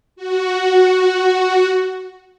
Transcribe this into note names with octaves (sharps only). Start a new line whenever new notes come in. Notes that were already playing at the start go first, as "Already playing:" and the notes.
F#4